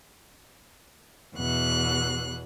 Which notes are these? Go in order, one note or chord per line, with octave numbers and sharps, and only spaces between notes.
E2 B2 F#6